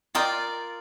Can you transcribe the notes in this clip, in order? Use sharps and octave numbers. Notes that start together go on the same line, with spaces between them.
F4 A#4 D5 D#5 G5